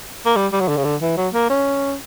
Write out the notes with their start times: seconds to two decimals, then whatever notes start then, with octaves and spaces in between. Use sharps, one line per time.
0.26 A#3
0.36 G3
0.52 G3
0.61 F#3
0.68 D3
0.77 C#3
0.85 D3
1.02 E3
1.17 F#3
1.34 A#3
1.50 C#4